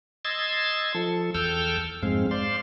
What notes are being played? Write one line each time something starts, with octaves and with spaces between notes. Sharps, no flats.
D#5 C6 E6 G#6 A6
F3 A4
E2 A4 G5 E6 F6 G6
F2 G#2 G#3 C4 F5
C5 D5 F5 C6